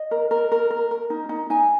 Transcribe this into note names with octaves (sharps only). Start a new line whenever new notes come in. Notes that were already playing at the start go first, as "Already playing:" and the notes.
Already playing: D#5
A#4
A#4
A#4
A#4
A#4
D#4
D#4
D#4 G#5